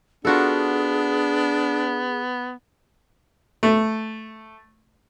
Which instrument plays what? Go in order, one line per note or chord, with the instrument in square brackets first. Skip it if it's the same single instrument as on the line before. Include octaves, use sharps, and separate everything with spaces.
[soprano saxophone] B3 [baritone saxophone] D4 [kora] F4 F#4 A4 [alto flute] G#4
[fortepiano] A3